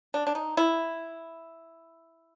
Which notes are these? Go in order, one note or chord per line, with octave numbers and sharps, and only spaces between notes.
D4
D4
D#4
E4